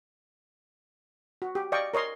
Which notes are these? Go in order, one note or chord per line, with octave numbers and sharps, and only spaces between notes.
F#4
G4
D5 D#5 F5 G5 C#6
A#4 C#5 D#5 C6